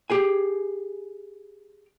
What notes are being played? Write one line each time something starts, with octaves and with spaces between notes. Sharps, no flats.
G4 G#4 G#5